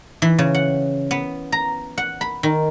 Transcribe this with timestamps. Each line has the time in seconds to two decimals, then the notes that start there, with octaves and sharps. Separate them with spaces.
0.22 E3
0.39 C#3
0.54 F#5
1.11 B3
1.52 A#5
1.98 F#5
2.21 B5
2.43 D#3